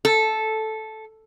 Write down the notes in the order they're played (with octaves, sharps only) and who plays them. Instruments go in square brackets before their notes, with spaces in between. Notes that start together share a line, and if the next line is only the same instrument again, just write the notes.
[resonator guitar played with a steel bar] A4